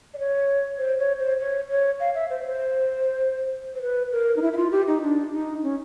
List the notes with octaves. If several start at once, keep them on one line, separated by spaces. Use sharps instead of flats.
D5
C#5
C5
C#5
C5
C#5
C#5
F5
E5
C5
C5
C5
B4
A#4
D#4
E4
E4
F4
G4
D#4
D4
D#4
C#4